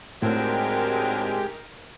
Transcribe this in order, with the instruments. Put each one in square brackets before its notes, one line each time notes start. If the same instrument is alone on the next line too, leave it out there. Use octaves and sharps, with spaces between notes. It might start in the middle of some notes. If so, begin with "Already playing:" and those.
[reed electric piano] A2 [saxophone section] D3 F#3 C4 [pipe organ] G#3 G4 [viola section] D#4 A#4